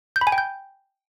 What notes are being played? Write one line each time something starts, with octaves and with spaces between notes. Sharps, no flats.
G6
B5
G#5
G5
G6